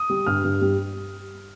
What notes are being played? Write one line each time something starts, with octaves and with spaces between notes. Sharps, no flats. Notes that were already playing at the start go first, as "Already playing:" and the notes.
Already playing: D#6
G3
G2 F6
G2
G3